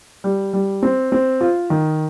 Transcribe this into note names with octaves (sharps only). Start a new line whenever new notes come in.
G3
G3
C4
C4
F4
D#3